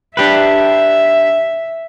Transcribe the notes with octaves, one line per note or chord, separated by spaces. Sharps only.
D4 G4 B4 E5